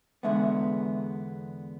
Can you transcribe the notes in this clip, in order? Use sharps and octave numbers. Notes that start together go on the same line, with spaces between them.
E2 D3 G#3 B3 E5